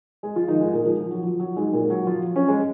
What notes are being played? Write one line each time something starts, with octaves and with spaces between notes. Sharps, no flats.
G#3 G#4
F3 F4
D#3 D#4
G#2 G#3
A#2 A#3
F3
F3
F#3
F3
F#3
G#2 G#3
A#2 A#3
F#3
F3 F4
C#4 C#5
G#3 G#4